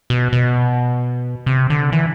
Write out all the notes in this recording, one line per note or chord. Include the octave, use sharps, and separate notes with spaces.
B2
B2
C3
D3
E3